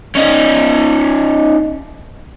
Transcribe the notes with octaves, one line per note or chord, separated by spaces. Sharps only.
C#4 D#4